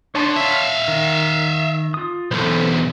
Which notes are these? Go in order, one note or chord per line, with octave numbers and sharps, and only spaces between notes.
D3 C#5 A5 C6
E5 F5
D#3
F4 D#6
B1 E2 A4 B4 C5